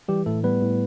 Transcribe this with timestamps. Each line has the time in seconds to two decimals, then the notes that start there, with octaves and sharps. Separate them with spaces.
0.08 E3 G3 G4
0.26 A2 A3 A4
0.44 G3 B3 B4
0.62 A2